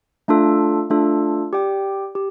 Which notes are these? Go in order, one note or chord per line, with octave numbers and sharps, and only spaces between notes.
A3 D4 F4 A4
A3 D4 F4 A4
G4 D5 G5
G4